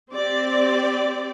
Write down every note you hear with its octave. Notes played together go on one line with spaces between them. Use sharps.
C4 G4 D5